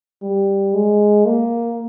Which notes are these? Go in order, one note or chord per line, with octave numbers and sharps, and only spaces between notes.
G3
G#3
A#3